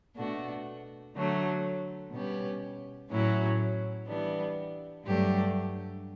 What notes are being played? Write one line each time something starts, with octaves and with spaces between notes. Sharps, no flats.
B2 A3 D4 F#4
D3 F#3 A3
B2 G3 C#4 G4 B4
A2 F#3 C#4 E4
E3 G3 B3 D4
G2 F#3 A3 D4 G4